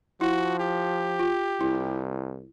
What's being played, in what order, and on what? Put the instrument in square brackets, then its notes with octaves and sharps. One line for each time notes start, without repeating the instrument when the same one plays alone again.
[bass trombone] F3 [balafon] E4 [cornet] F#4
[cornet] G4
[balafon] F4
[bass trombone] C2 [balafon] E4